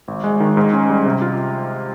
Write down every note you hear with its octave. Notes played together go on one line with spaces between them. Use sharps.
G#1
G#3
D#3
G#2
C#4
G3
C3
F4